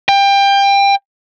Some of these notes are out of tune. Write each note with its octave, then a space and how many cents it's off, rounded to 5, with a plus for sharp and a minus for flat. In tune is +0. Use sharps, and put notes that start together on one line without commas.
G5 +25